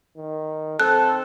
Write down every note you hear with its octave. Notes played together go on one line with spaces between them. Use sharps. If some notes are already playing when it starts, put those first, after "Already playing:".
D#3
C4 A4 F#6